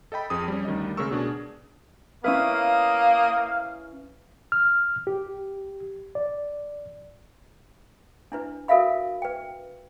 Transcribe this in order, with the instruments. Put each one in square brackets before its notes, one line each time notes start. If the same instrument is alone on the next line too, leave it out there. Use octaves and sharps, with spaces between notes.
[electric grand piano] A4 D#5 G5 B5
F2 C4 G#4 D#6
G3 C#4
D2 D#3 G3 D#5
C#3 G#3 A3 A#4 C#6 E6
B2 D4 G#4
[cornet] A#3 [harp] C#4 E4 B4 [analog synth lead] F5 [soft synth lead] D#6
[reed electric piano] F6
G4
D5
[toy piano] D4 E4 B4
F#4 A4 A#4 E5 F5 B5
B4 G5